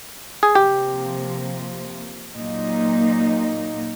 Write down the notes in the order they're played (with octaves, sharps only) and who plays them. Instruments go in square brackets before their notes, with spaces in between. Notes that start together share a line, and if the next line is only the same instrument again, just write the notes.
[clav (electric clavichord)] G#4
[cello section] C3 F3 A#3 [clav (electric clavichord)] G4
[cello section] A#2 F#3 A#3 D#4